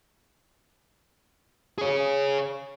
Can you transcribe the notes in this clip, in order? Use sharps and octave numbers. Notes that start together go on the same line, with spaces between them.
G#4 C#5